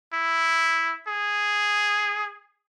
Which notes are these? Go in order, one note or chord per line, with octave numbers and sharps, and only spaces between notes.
E4
G#4